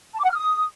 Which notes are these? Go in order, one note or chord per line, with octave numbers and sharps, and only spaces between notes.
A5
D6
F#5
F6
D#6